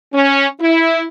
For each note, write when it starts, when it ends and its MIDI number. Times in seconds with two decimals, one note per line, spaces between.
0.14 0.47 61
0.61 1.04 64